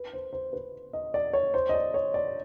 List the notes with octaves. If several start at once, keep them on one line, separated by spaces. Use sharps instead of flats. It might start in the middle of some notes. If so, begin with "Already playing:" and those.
Already playing: B4
C5
C5
B4
D#5
D5
C#5
C5
D#5
D5
C#5
D5